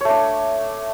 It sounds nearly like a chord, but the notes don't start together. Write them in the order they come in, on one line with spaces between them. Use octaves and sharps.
C#5 A3 D4